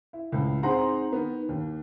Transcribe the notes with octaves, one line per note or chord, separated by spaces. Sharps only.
E4
C#2 A2
C4 D#4 G#4 F#5 A#5 C6
D#3 B3
D#2